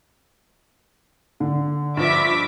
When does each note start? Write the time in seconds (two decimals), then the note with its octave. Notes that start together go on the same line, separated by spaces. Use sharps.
1.40 D3
1.97 G2 F3 E5 D6 B6